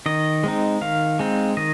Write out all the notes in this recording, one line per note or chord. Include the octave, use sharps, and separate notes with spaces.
D#3 D#5
G#3 C4 D#4
D#3 F5
G#3 C4 D#4
D#3 D#5